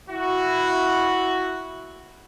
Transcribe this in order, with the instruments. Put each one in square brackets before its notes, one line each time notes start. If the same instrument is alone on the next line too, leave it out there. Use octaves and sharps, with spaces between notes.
[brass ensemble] E4 F#4